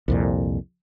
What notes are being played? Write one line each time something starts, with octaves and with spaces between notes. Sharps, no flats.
C2 F2 A#2